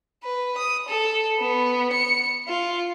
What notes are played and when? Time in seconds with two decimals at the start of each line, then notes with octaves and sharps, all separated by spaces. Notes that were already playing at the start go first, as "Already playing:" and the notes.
0.23 B4
0.58 D#6
0.89 A4
1.39 B3
1.93 C#7
2.48 F4